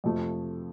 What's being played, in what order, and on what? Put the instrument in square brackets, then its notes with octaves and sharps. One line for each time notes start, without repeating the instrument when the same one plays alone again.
[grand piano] F2 C3 F3 A3